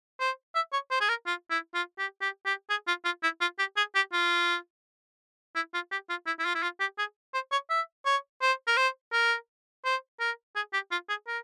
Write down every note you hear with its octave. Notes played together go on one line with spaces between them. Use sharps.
C5
E5
C#5
C5
G#4
A#4
F4
E4
F4
G4
G4
G4
G#4
F4
F4
E4
F4
G4
G#4
G4
F4
E4
F4
G4
F4
E4
E4
F4
E4
F4
G4
G#4
C5
C#5
E5
C#5
C5
A#4
C5
A#4
C5
A#4
G#4
G4
F4
G#4
A#4